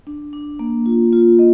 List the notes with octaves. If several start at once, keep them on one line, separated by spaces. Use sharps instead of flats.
D4
D4
A#3
F4
F4
D#5